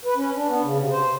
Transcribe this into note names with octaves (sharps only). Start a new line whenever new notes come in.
B4
C#4
D4
B3
C#3
C3
C5